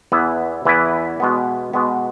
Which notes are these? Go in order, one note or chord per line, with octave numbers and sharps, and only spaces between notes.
E2 E3 B3 E4 B4
E2 E3 B3 E4 B4
B2 G#3 B3
B2 G#3 B3